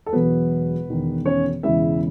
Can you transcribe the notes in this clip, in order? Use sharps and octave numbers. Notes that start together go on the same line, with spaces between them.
A4
E1 E2 B2 F#3 B3 B4
E1 E2 D#3
C#4 C#5
E1 E2 C#3 G#3 E4 E5